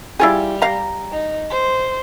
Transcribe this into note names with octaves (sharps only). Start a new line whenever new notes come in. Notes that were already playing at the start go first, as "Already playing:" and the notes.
G3 E4 F4 G#4
F5 A#5
D#4
C5